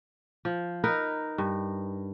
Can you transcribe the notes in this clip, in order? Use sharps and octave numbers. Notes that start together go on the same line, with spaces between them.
F3
D#4 A#4 B4
G2